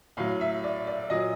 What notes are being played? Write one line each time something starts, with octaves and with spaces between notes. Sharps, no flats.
A2 F#3 F5
E5
D5
D5
A#2 F#3 D#5